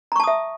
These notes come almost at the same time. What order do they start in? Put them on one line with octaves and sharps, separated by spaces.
A#5 C#6 A5 D#6 E5